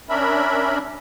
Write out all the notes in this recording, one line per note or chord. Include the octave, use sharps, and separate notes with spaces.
C#4 D4 A#4 E5 B5